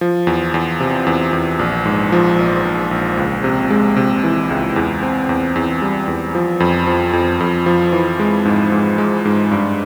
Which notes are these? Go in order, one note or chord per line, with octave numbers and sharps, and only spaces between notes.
F3
E2
E2
C3
E2
E2
A#1
G#2
F3
A#1
A#1
A#1
C#2
C3
G#3
C3
E3
C#2
E2
C4
E2
E2
G3
E2
F3
F2
F3
F2
F2
F3
E3
G#3
G#2
G#2
G#3
G#2
G2